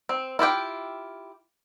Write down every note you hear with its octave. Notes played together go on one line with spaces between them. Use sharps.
C4
E4 F4 G4 G5